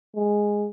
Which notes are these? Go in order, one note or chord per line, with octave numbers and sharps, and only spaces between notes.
G#3